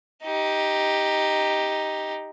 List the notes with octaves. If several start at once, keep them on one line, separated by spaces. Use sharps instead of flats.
D#4 G4